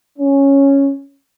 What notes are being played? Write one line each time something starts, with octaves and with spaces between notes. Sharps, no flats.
C#4